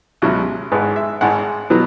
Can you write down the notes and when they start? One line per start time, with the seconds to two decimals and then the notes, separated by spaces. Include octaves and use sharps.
0.22 C#2 B2 F#3 C#4 E4
0.72 G#1 G#2 G#3 B4
0.96 E5
1.21 G#1 G#2 G#3 F#5
1.70 B2 F#3 B3